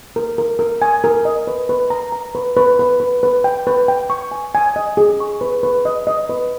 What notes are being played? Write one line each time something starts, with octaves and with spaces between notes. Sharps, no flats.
A#4
A#4
A#4
G#5
A#4
D#5
B4
B4
A#5
A#5
B4
B4
B4
B4
B4
G5
B4
G5
C#6
G#5
G#5
D#5
G#4
C#6
B4
B4
D#5
D#5
B4